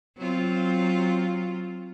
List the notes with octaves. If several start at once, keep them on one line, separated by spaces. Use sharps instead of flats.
F#3 C4 F4